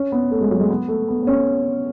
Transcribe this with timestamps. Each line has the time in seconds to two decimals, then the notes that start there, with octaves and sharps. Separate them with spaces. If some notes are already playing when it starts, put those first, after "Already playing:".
Already playing: C#4
0.12 B3
0.31 A3
0.41 G#3
0.51 F#3
0.60 G#3
0.70 B3
0.88 A3
1.08 B3
1.23 B3
1.27 C#4